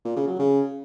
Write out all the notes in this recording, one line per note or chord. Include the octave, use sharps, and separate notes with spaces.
A#2
C#3
F#3
C#3